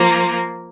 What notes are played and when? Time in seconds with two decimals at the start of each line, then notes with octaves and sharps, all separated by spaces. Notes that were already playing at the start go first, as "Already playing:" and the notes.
Already playing: F3 A#3